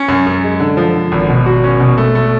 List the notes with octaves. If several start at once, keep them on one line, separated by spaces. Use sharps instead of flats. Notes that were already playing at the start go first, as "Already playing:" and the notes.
Already playing: C#4
F#2
F#2
G#3
D3
F3
D3
G#1
B2
F#4
C#4
B2
A3
A3